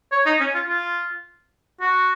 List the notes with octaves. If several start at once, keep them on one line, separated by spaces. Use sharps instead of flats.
C#5
D#4
C#4
F4
F4
F#4